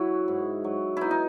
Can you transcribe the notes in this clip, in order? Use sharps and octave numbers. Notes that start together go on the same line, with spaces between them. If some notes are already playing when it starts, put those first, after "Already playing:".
Already playing: F#3 E4 F#4
G#2
F#3
B2 D#4 E4
D#4